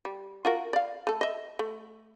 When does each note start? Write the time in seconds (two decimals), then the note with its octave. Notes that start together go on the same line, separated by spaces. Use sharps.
0.05 G3
0.45 F4 F#4 A#4
0.73 D5 F5
1.07 A3 A4
1.21 D#5 E5
1.59 A3